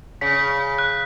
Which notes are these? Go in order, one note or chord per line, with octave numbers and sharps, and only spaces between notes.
C#3 B6
F#6